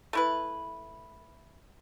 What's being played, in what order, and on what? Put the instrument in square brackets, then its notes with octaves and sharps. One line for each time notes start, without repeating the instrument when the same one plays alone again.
[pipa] A3 E4 B4